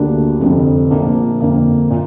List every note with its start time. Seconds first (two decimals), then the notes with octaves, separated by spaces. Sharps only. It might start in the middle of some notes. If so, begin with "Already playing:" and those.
Already playing: D2 D3 A#3 D4 G4
0.40 F1 F2 D3
0.91 A#1 A#2 F3 A#3 D4
1.41 F2 D3 A#3
1.90 A#2